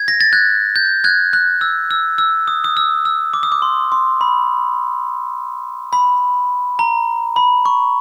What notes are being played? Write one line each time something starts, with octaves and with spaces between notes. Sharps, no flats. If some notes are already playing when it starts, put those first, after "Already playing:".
Already playing: G#6
A#6
A6
F#6 G#6
G6
F#6 G#6
F#6
E6
E6
E6
D#6
D#6
E6
E6
D6
D#6
D6
C6
C6
B5
B5
A#5
B5
C#6